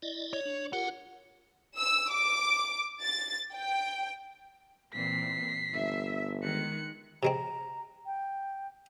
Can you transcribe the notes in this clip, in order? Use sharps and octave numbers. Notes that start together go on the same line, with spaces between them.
E4 D5 D#5
C#5
D4
F4 G4 A#4 F#5
E6
D6
A6
G5
A#2 E3 C4 B6 C7
G1 E5
D#3 G#3 F#6 C#7
C3 G#3 C4 A#5
G5